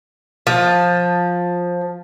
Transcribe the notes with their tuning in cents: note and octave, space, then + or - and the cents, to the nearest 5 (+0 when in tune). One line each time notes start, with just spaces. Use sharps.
F3 +15